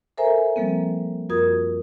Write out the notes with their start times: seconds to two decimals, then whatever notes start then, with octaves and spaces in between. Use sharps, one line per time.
0.18 A4 A#4 C5 E5 G#5 A#5
0.56 F3 G3 A#3 C4
1.29 F#2 F4 F#4 A#4 D#6 G#6